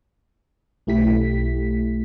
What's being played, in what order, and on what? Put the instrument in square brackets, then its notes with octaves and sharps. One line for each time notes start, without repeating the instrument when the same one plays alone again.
[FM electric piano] B1 A3 E4 G4 B6